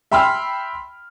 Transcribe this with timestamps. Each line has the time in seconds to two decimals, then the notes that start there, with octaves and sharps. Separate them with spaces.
0.12 E5 G5 B5 C6 E6 F6